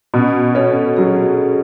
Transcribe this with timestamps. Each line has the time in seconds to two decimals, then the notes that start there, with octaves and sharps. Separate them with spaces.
0.14 B2 C#4
0.55 C#4 A4
0.97 F#3 G#4